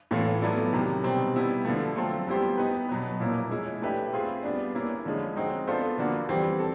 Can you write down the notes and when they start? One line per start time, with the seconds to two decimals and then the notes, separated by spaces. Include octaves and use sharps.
0.11 A2 E3 A3 C#4 F4
0.42 F#3 B3 E4 A4 D5
0.73 C3 D#3 F#3
1.03 B2 G3 C4
1.34 G3 B3 E4 G4
1.65 D3 F3 A3
1.96 F#3 A3 C4 F4 A4
2.27 G3 B3 E4 G4 C5
2.58 B3 D#4 G4 B4
2.89 B2 F#3 B3
3.20 A#2 F3 A#3 C#4 E4
3.50 G#3 C#4 E4
3.82 A3 D4 G4 B4 E5
4.13 C4 F4 G#4
4.43 G3 B3 D4
4.75 A#3 C#4 E4
5.05 D3 F3 G#3 C#4
5.36 G#3 C4 D#4 F#4
5.67 B3 D4 F4 A4 C5
5.98 D3 F3 A#3 D4 F#4
6.29 E3 G3 C4
6.59 A4